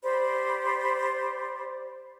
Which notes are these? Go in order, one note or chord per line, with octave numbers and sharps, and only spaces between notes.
G4 C5 D5 B5